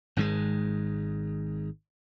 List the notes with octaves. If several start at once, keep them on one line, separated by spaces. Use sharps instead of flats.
G#1 G#2 D3 G#3